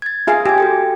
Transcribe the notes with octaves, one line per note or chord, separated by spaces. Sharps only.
G#6 A6
F4 G#4 E5 F5 G#5
G4 G#5 G#6
F#4 A4 G5